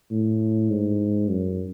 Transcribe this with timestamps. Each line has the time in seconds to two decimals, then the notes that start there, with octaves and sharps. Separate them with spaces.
0.11 A2
0.70 G#2
1.30 F#2